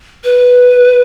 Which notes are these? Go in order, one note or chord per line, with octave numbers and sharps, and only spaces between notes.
B4